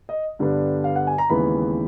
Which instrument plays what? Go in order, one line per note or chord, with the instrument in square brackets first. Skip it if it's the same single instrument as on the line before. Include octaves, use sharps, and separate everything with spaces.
[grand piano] D#5
G2 D3 G3 B3 D4
F5
F#5
G#5
A#5
D#2 C#3 E3 G#3 B3 B5